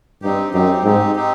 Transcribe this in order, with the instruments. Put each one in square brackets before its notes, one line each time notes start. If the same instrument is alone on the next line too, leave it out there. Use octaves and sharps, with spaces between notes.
[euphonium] G2 [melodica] C4 D#4 G4
[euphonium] F#2 [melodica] C4 D#4 G4
[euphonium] G#2 [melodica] C4 D#4 G4
[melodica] C4 D#4 G4